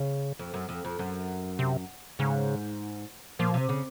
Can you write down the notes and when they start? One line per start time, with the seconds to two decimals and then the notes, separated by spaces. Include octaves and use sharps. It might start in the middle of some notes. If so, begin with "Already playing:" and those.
Already playing: C#3
0.39 F2
0.54 F#2
0.69 F2
0.85 F2
0.99 F#2
1.59 C3
2.19 G#2 C#3
3.39 A#2 F3
3.54 C3
3.69 C#3